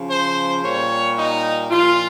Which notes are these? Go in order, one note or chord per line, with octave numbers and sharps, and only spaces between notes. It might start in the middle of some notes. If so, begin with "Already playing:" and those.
Already playing: C#3 F3
C5
A#2 G3 C#5
D#4
A#2 F3 F4